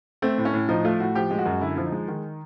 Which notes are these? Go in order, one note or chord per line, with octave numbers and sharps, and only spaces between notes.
A3 C4
A2
C#4
A2
F3 D#4
A3 F4
A2 F#4
F3 G4
G#3
F#4
F#2
D3 E4
F3
D#4
G#3
D#3